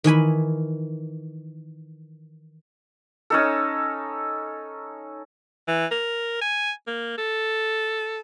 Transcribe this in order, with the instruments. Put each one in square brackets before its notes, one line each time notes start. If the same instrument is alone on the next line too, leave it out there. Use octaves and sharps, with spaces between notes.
[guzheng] D#3 E3 G#5 B5
[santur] C#4 D#4 A4
[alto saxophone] E3
A#4
G#5
A#3
A4